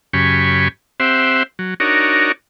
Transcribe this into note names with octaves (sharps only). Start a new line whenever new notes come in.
F#2 C#3 G4 G#5 B5 C#6
C4 G4 C5 E5 F#5
F#3
D4 D#4 F#4 A#4 C#5